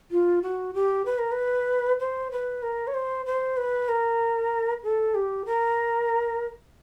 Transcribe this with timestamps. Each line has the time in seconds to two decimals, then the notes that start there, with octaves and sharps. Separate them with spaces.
0.11 F4
0.43 F#4
0.74 G4
1.06 B4
1.19 A#4
1.32 B4
2.00 C5
2.32 B4
2.63 A#4
2.87 C#5
2.94 C5
3.26 C5
3.57 B4
3.89 A#4
4.83 A4
5.15 G4
5.46 A#4